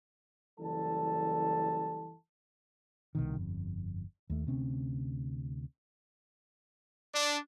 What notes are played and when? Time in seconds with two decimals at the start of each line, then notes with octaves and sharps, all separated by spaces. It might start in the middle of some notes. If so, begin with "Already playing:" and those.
0.60 F#1 E3 G3 A4 A5
3.15 C2 B2 D#3
3.35 G1 F2
4.30 D#2 A3
4.47 D2 C3 C4 C#4
7.14 D4